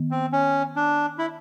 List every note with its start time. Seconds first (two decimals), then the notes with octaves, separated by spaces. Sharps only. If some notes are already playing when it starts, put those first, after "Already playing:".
Already playing: D#3 B3
0.11 C4
0.32 C#4
0.76 D4
1.18 E4